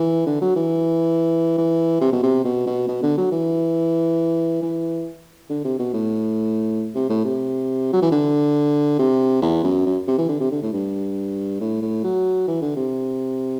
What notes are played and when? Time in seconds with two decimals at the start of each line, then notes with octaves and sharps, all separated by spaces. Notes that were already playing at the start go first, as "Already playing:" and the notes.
Already playing: E3
0.26 D3
0.41 F#3
0.56 E3
1.58 E3
2.01 C3
2.12 B2
2.23 C3
2.44 B2
2.66 B2
2.88 B2
3.03 D3
3.17 F#3
3.32 E3
4.63 E3
5.50 D3
5.64 C3
5.79 B2
5.94 A2
6.95 C3
7.10 A2
7.25 C3
7.93 F#3
8.02 E3
8.11 D3
8.99 C3
9.42 E2
9.64 F#2
9.86 F#2
10.08 C3
10.18 E3
10.29 D3
10.40 C3
10.51 D3
10.62 A2
10.73 G2
11.60 A2
11.82 A2
12.04 F#3
12.48 E3
12.62 D3
12.76 C3